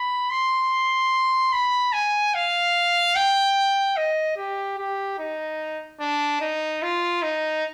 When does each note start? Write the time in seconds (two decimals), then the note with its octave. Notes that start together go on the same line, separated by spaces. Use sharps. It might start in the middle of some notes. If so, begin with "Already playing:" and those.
Already playing: B5
0.31 C6
1.53 B5
1.93 G#5
2.34 F5
3.16 G5
3.96 D#5
4.37 G4
4.79 G4
5.19 D#4
6.00 D4
6.41 D#4
6.82 F4
7.22 D#4